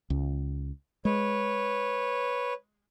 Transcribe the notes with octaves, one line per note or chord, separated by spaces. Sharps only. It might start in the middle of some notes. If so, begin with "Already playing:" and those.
C#2
G#3 B4 C#5